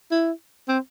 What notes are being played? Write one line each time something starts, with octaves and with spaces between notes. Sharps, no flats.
E4
C4